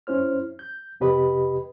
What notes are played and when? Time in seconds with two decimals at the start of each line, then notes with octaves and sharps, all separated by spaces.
0.07 F#2 C#4 E4 C5 F6
0.59 G6
1.00 F2 C3 G4 B4 D#5 B5